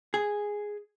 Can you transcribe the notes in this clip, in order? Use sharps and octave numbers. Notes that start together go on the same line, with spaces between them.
G#4